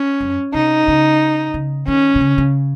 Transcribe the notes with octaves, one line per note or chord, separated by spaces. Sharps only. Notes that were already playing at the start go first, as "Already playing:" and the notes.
Already playing: C#4
F#2
C3 D#4
C#3
C#3
D#3 C#4
C3
C#3
C#3